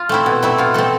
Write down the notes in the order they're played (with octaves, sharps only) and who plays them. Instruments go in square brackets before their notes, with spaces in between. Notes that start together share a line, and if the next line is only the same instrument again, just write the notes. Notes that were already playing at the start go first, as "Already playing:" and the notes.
Already playing: [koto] F4
A3 C4 E4
B2
A3 C4 E4
B2 F4
A3 C4 A4